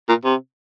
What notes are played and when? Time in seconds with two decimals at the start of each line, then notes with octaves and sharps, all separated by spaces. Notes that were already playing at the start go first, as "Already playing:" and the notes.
0.09 A#2
0.25 C3